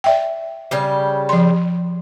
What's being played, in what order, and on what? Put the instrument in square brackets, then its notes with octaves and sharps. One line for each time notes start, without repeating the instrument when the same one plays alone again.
[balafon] D5 E5 G5
[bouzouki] C#3 G3 G4
[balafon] F3 C6